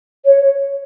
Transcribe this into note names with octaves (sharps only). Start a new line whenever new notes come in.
C#5